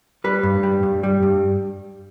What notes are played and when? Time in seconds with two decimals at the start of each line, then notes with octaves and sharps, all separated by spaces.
0.24 G3 B4
0.43 G2
0.63 G3
0.83 G2
1.03 G3
1.23 G2